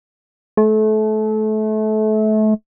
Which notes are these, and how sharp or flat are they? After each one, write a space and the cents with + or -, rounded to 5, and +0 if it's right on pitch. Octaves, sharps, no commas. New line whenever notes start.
A3 -30